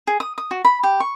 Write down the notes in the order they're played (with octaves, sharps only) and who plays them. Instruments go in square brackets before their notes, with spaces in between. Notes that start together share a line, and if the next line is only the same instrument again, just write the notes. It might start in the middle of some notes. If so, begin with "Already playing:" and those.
[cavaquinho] G#4
D#6
D#6
F#4
B5
G4
C#6